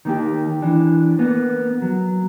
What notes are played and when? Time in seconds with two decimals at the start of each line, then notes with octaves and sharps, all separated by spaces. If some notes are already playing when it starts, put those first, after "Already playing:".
0.05 D#3 A#3 G4
0.62 E3 D4
1.19 A#3 B3
1.82 F#3